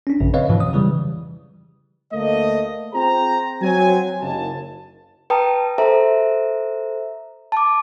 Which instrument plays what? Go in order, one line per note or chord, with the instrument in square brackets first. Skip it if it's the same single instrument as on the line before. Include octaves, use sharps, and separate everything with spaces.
[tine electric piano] C#4 D4
A#1 F#2 C#3
C4 B4 C#5 D#5 F5
F2 G#2 B2 E3 F3
D#6
C#3 E3 G3
[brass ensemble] D2 A3 A#3 D#5
C4 F4 G#4 C5 G5 A#5
F#3 C4 G#5
F#1 D#2 A5
[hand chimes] B4 G5 A5 A#5 D#6
A4 C5 E5 A#5
A5 D6